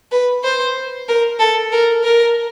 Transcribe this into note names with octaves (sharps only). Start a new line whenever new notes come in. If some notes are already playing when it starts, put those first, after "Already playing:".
B4
C5
A#4
A4
A#4
A#4